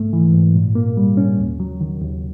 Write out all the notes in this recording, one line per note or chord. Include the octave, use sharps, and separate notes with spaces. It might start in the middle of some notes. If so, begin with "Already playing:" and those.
Already playing: G#2 A3
E3
G#2
A#2
A#3
G3
C#4
D#2
F#3
D#3
D#2